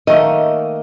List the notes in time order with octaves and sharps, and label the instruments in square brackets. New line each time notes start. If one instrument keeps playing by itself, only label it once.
[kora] D#3 A3 A#3 [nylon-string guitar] D#5